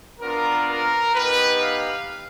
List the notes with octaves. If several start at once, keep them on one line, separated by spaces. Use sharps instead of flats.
B3 D4 F4 A#4
A#4
B3 D#4 G4 B4
F5